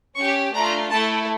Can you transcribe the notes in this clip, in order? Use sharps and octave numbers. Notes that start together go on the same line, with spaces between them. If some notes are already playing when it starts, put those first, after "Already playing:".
C#4 G4 C#6
A3 D4 F4 A#5
A3 E4 A4 A5